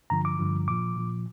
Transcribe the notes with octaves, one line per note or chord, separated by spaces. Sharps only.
G2 D3 F3 A#5
D6
G2 D3 F3
A#2 F3 D6
A#2 F3